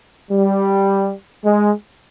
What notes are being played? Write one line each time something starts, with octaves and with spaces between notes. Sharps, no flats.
G3
G#3